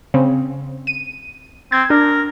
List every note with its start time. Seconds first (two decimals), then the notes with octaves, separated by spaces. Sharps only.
0.14 C#3 C4
0.87 D#7
1.72 C4 G#6
1.90 D4 A#4